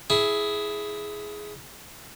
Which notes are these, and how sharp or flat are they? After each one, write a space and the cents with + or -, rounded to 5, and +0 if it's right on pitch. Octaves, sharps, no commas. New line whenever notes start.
E4 +0 G#4 +10